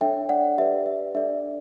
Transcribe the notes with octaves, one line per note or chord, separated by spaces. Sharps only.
D4 A4 C#5 E5 G5
D5 F#5
G4 B4 D5 E5
E5
D4 A4 D5 E5